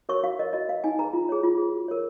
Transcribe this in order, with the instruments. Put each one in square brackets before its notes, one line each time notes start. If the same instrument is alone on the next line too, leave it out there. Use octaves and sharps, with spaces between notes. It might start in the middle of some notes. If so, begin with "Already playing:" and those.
[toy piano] F#4 A#4 C#5 C#6
F#4 F5
A#4 C#5 D#5
F#4 D#5
B4 F5
D#4 G#5
G#4 B4 A#5
F4
G#4 C#5
F4
G#4 B4
F#4
A#4 C#5